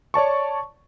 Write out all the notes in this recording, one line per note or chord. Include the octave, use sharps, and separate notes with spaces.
C#5 D5 A5 C#6